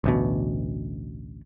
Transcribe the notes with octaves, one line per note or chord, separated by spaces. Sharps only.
A1 D2 B2